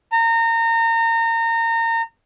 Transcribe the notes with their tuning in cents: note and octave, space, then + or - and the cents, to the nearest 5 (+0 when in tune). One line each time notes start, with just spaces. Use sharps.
A#5 -30